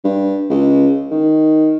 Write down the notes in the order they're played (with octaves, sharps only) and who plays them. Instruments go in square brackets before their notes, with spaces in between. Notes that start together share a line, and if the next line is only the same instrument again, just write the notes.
[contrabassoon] G2
C#2
D#3